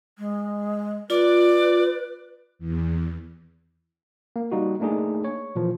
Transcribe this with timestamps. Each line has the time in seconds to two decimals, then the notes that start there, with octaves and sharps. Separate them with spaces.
0.19 G#3
1.10 F4 B4 D5
2.59 E2
4.36 A#3
4.52 G3 D#4 F#4
4.80 A3 A#3 D4 D#4 G#4
5.24 C#5
5.55 A#2 E3 F3